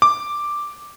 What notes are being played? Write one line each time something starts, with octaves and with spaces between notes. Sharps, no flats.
D6